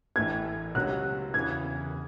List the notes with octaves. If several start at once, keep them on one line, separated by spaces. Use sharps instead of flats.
A1 A2 E3 A3 G#6
C#2 C3 F#3 C#4 F#4 F#6
E2 C#3 E3 G#6